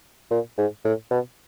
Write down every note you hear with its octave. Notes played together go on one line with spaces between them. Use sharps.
A#2
G#2
A2
B2